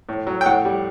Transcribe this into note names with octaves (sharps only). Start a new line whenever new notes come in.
A2
F#3
G5
A2 F#5
G3